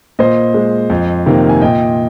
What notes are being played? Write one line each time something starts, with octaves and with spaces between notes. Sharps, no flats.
A#2 C5 D#5
G#3
F2
C3 D#3 A#3
G#5
A#2 D#5 G5